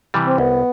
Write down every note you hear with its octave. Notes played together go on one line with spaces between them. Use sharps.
C3 E3 G3
C4
C2 B3